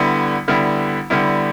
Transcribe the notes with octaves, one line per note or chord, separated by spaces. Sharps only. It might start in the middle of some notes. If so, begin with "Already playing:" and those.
Already playing: D3 G3 B3 E4
D3 G3 B3 E4
D3 G3 B3 E4